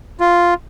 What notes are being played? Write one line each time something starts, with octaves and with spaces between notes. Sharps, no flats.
F4